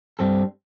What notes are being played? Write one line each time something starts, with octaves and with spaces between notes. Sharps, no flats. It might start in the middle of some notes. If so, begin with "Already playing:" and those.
G2 G3 C4 A4